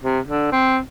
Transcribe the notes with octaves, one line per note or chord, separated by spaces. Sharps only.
C3
D3
C4